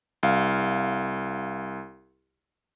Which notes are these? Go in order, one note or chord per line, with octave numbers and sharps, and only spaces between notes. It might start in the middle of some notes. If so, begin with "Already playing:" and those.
C2 F5